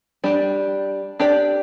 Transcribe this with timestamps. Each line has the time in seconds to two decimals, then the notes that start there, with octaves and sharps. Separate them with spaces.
0.24 G3 D4 G4
1.20 D4 G4 D5